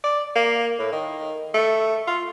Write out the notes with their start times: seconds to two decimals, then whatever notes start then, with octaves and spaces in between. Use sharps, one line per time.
0.04 D5
0.35 A#3
0.79 A2
0.92 D#3
1.54 A3
2.07 F4